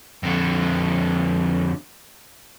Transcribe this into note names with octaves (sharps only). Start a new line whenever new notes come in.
F2 D3